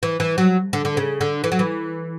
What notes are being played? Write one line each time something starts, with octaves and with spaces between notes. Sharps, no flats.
E3
E3
F#3
D3
D3
C#3
D3
E3
F#3
E3